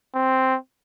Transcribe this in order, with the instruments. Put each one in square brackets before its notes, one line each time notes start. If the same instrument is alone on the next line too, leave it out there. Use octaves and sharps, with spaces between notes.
[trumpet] C4